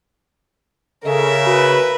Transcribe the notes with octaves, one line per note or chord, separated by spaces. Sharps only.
C#3 A4 A#4 E5
F#4 B4